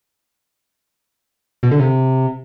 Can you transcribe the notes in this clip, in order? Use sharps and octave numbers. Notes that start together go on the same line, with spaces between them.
B2
D3
C3